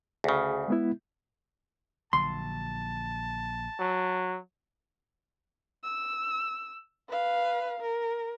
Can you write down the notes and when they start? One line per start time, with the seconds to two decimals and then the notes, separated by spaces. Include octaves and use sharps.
0.24 D2 C#3 G#4
0.68 G#3 B3 E4
2.13 A#1 D3 F#3 A5 C6
3.80 F#3
5.84 E6
7.10 B4 F5
7.81 A#4